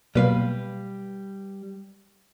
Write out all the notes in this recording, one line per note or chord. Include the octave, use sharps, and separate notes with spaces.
B2 F#3 G3 A#3 B4 F5